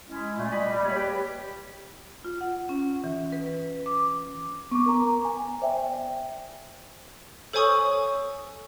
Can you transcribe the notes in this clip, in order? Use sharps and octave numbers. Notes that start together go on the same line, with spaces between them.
G#3 C#4 E4
A#2 G#3 A3 F4
G3 D#5 B5
G3
D#2 C#5 B5
G4 B4
F4
F#5
C#4
E3
B4
D6
B3 C#6 D6
A#4 A#5
G#5
C5 D5 E5 G5
A4 C5 C#5 G#5 C#6 D#6